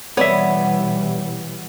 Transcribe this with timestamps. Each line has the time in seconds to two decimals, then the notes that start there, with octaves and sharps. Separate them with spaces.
0.17 B2 E3 G3 B3 C#5 D5 E5